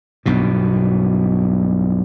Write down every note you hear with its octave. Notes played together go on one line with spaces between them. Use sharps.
B1 G2 B2